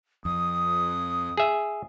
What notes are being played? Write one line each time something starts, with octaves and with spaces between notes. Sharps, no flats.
F2 D#6
G#4 E5